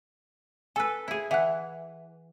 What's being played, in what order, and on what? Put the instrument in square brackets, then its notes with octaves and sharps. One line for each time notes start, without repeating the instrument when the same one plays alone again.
[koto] A4 B4 [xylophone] G#5 E6 F#6
[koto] E4 G#4
[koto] E3 [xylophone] E5 F#5 F#6